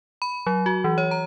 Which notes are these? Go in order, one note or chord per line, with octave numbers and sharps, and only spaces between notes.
B5
F#3
F#4
E3
C#5
A#5